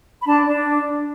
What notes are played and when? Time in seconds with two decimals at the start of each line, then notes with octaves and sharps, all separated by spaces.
0.20 B5
0.27 D4 A5
0.46 D4